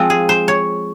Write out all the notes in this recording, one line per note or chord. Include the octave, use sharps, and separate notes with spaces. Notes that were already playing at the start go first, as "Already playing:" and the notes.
Already playing: F3 G#3 C4 F4
G#4
C5
C#5